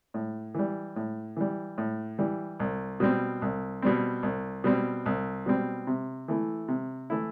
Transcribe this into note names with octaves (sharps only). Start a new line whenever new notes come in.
A2
E3 G3
A2
E3 G3
A2
E3 G3
C2
B2 G3 C4
C2
B2 G3 C4
C2
B2 G3 C4
C2
B2 G3 C4
C3
E3 A3 E4
C3
E3 A3 E4